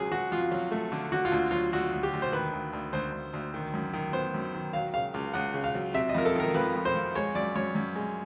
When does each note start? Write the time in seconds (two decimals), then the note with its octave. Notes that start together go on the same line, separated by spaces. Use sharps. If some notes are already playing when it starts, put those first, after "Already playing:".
Already playing: C#2 F#3 G#4
0.11 F#3 F#4
0.32 F2 F4
0.52 F#3
0.71 A3
0.92 D3
1.12 D3 F#4
1.25 F4
1.32 D2
1.51 F#3 F4
1.73 D2 F#4
1.92 D2
2.03 G4
2.13 D2
2.22 C5
2.32 D#3 B4
2.53 D2
2.73 D2
2.93 D2 C5
3.13 D2
3.33 D2
3.54 D#3
3.74 F#2
3.93 D#3
4.13 B3 C5
4.34 F#2
4.54 D#3
4.73 F#3 F5
4.94 C#3 F5
5.14 C#2
5.34 C#2 F#5
5.54 C#3
5.64 F5
5.75 F#3
5.94 C3 E5
6.09 D#5
6.15 F2 A#4
6.25 A4
6.35 D#3 A#4
6.54 F2 B4
6.75 F2
6.85 C5
6.95 F2
7.15 G#3 C#5
7.35 F#2 D5
7.55 F#2 C#5
7.75 F#2
7.96 G#3